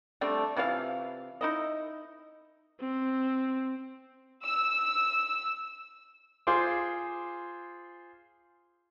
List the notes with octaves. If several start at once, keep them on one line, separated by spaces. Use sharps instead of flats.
G3 A3 C4 D4
C3 E3 F4 F5
D#4 E4 D#5
C4
E6
F4 G#4 C5 C6 D6